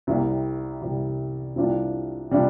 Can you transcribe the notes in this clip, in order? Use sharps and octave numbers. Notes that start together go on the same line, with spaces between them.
C2 C3 G3
C2 C3 G3
C2 C3 G3 D4 F4
C3 G3 D4 F4